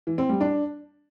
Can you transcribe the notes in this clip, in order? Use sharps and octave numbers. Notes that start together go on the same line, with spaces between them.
E3
C4
G3
D4